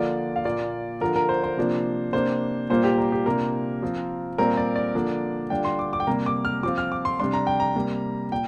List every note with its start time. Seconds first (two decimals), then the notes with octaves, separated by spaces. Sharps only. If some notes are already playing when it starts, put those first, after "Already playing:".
Already playing: D3 F3 A#3 D4 F4 D5
0.36 F5
0.45 A#2 A#3 F4 D5
1.01 D3 F3 D4 F4 A#4
1.16 A#4
1.29 C5
1.43 C5
1.57 C3 F3 A#3 D4
2.13 C3 A#3 D4 C5
2.70 A#2 G3 A#3 F4 C5
2.84 G4
2.98 A#4
3.12 G4
3.26 C3 A#3 D4 F4 A#4
3.82 F3 C4 F4
4.38 A#2 G3 C4 F4 A#4
4.57 D5
4.76 D5
4.95 D3 F3 A#3 D4
5.50 D3 G3 D4 F4 G5
5.65 C6
5.79 D6
5.93 D6
6.00 G5
6.07 C3 G3 A#3 A#5
6.26 D6
6.45 F6
6.63 F3 C4 F4 D6
6.78 F6
6.92 D6
7.05 C6
7.20 C3 G3 D4 C6
7.33 A#5
7.47 G5
7.60 A#5
7.76 C3 G3 A#3
8.31 A#2 G5